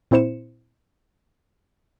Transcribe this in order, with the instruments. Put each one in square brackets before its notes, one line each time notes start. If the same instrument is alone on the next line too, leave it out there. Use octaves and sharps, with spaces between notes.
[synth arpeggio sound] A#2 C4 E4 C5 C#7 E7